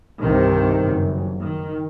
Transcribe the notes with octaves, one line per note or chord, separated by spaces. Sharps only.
C2 G2 C3 D#3
F#1
D#3